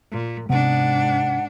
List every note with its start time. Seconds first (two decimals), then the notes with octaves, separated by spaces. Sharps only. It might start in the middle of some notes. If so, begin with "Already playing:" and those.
0.12 A#2
0.49 G#2 C3 B3 D4 F#5